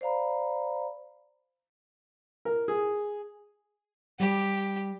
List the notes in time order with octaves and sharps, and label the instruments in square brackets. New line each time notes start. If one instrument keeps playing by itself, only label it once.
[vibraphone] C5 D5 F5 A#5 B5
[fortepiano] A#4
G#4
[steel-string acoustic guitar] G3 [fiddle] G4